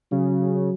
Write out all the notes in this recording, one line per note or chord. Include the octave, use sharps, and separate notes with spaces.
C#3 F#3